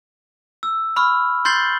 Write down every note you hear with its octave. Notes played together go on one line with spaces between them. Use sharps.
E6
B5 C#6 E6 F6
C6 G6 A6 C7 F#7 G7